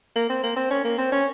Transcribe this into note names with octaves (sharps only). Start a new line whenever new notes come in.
A#3
C4
A#3
C4
C#4
A#3
C4
C#4